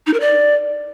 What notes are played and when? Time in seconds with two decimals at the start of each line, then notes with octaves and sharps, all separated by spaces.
0.07 D#4
0.14 A#4
0.20 D5